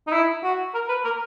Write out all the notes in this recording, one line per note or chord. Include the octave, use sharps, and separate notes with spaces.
D#4
E4
F#4
A#4
B4
A#4